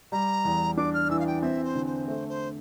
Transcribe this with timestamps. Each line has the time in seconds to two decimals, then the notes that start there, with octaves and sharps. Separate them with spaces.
0.12 G3 A#5
0.45 E2
0.77 D4 D6
0.94 F6
1.10 E3 E6
1.19 F5
1.27 G5
1.42 C4 E5
1.64 C5
1.75 D3
1.86 C5
2.08 A3 C5
2.29 C5